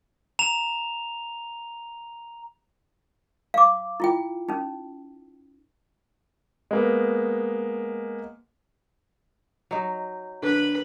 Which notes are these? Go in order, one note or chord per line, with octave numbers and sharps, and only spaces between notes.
A#5 F7
F5 D6
E4 F4 G5
C#4 D#4
G#3 A#3 B3
F#3 D#4
D3 B4 B5